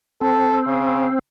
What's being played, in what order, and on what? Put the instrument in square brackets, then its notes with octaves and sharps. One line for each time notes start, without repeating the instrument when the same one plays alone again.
[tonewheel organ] C4 [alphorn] A4
[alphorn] C#3